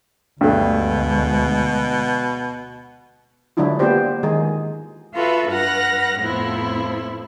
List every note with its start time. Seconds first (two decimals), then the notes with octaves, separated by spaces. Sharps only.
0.41 D2 G2 B2 G#3 A3
3.57 D3 F#3 G#3 D4 E4 F4
3.79 A#3 B3 D4 F4 G4 C5
4.23 D#3 G#3 G#4
5.16 F4 F#4 A4 B4 E5
5.51 G2 B4 F#5 F6 F#6 A#6
6.21 F2 A2 F3 B3 C4 E4